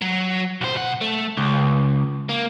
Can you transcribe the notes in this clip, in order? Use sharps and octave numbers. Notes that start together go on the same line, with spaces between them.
F#3
B1 C5
B2 F#5
A3
C#2
A#3